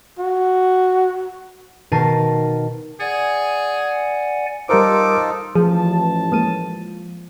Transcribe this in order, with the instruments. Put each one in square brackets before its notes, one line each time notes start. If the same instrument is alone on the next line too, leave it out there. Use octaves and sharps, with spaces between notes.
[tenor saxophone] F#4
[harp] B2 D#3 A#4 A5 C7 D#7
[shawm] G#4 [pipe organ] D5 F#5 G#5
[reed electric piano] G3 A#4 C5 [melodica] D#4 F4 A4 [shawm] D6
[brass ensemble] A1 A5 [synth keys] F3 [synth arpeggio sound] G#4
[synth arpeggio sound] G#3 A#3 D#7